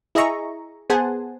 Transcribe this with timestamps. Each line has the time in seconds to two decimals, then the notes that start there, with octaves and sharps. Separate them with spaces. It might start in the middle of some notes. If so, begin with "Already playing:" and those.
0.15 E4 G#4 D#5 E5 A#5 C#6
0.90 B3 G#4 C5 F#5 G#5 A5